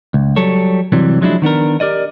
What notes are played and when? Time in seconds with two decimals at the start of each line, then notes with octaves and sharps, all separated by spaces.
0.14 C#2
0.36 F#3 G3 A4 C#5
0.92 C3 E3 F#3 G3
1.21 F3 F#3 G#3 D4 E4
1.42 D#3 B3 D4 A#4
1.80 G4 A#4 D5 D#5